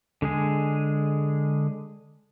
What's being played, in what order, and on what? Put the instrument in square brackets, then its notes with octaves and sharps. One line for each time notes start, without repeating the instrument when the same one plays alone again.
[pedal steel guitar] D3 G#3 G#4